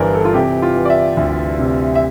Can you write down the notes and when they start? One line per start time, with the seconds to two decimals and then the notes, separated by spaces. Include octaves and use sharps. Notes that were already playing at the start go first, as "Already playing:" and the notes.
Already playing: G1 G2 E3 A#4 C5 D5
0.14 A4
0.25 F4
0.34 C3 G4
0.62 F4
0.76 E3
0.85 D5
0.90 E5
1.17 D2
1.59 C3
1.95 E5